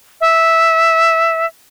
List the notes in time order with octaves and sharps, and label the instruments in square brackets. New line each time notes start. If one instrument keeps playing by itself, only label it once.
[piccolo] E5